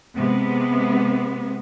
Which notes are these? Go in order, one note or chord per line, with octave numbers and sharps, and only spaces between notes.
C3 G#3 B3